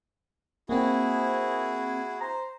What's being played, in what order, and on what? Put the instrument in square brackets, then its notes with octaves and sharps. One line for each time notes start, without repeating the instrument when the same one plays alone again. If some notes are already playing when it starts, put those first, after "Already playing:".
[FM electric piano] A#3 C4 [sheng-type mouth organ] E4 F#4 G#4
[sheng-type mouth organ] C5 [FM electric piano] A#5